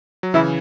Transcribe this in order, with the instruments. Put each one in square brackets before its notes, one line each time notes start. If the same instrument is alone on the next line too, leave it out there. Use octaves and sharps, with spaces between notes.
[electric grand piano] F#3
[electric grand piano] C#3 E3 [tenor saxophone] E4